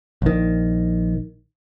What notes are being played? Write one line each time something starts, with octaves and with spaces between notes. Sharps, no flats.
A#1 D#3